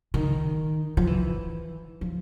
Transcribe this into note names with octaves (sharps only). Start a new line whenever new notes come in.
D#3
F3
E3
F3